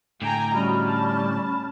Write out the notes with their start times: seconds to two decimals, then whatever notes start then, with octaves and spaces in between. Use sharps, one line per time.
0.22 A2 D3 G5 G#5 A#5
0.54 G3 C#4 F#4 D#5 B5 F6
0.87 A5